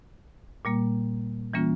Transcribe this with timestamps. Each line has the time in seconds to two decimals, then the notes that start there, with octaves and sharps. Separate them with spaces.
0.65 A#2 G3 A#3
1.54 E3 G3 A#3 C#4 F4